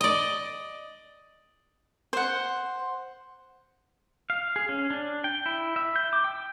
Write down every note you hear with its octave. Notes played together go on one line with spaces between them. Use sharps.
D5 D#5
C5 F#5
F5
G#4
C#4
D4
G5
E4
E5
G6
D6
G5